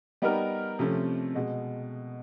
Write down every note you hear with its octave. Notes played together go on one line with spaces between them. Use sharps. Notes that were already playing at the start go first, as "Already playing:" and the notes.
G3 B3 D#4 G4 A#4
C3 F3 A3 C#4
B2 G#3